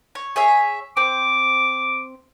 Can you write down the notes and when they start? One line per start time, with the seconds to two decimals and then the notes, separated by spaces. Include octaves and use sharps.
0.15 C#5
0.36 G#4 C#5 E5
0.97 C4 D6